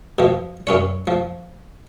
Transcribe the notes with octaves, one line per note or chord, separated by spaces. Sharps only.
B2 F3
F#2 C#4 C#5
F3